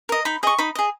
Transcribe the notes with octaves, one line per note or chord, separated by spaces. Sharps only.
A#4 D#5
D#4 B5
G#4 D#5 C#6
D#4 B5
G#4 D#5